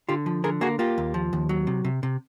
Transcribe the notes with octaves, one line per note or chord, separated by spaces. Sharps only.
D3 F4 G4
F3
D3 G#4 A#4
A#3 F#4 G#4
A#3 F4 G4
D#2
F3
D#2
F#3
C3
C3
C3